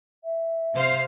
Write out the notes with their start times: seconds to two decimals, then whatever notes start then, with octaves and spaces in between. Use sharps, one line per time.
0.24 E5
0.74 C3 C5 F5